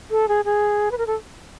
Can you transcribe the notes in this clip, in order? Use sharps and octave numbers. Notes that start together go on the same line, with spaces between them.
A4
G#4
G#4
B4
A#4
A4